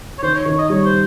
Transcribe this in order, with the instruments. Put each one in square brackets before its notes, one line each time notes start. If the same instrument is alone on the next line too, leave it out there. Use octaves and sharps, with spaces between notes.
[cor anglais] C#5
[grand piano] D#3 [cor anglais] C5
[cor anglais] C#5
[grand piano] D#3 [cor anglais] C#5
[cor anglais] D#5
[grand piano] G3 [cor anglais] C#5
[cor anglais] C5